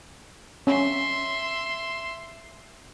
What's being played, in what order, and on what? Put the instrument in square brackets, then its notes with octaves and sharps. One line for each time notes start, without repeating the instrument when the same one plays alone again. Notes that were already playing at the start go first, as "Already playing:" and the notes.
[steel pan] C#4 [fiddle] E5 C6